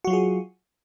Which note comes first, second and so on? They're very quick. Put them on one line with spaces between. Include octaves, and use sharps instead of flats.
F#4 F#3 F4 G#4